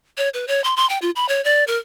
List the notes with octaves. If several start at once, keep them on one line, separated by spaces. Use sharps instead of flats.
C#5
B4
C#5
C6
C6
G5
F4
B5
C#5
D5
A#4